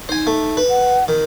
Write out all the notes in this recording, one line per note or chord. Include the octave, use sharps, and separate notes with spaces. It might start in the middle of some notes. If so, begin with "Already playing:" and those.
D#4 C5 G#5
A3
B4
F#5
D#3